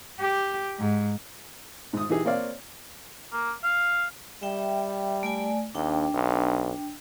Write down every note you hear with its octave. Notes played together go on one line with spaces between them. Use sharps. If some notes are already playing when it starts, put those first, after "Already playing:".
G4
G#2
G#2 D#6
E3 D#4 G4 G#4
A#3 C4 C#5 D5 F5
A#3
F5
G3 E5 G5
A3 D5 G#5
D#2 D4 G5
B1